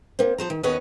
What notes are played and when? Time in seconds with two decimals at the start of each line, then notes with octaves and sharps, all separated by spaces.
0.19 A#3 C4
0.38 F3 C5 A#5
0.50 D#3
0.63 D#2 B3 C#4 B4 C#5 D#5